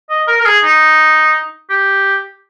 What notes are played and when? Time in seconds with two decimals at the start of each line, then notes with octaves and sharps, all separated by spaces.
0.10 D#5
0.27 A#4
0.41 A#4
0.46 G#4
0.63 D#4
1.70 G4